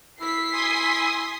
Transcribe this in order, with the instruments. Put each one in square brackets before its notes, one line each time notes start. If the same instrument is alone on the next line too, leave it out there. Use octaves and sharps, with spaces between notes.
[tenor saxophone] E4 [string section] B6 C7
[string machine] G#5 C6 D#6